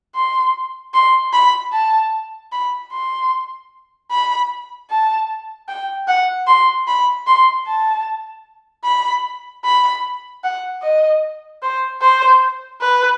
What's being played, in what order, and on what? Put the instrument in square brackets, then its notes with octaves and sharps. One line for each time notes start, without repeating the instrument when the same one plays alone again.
[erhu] C6
C6
B5
A5
B5
C6
B5
A5
G5
F#5
C6
B5
C6
A5
B5
B5
F#5
D#5
C5
C5
B4